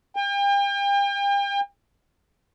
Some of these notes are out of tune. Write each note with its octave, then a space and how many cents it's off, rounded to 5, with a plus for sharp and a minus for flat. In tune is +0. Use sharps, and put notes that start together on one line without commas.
G5 +40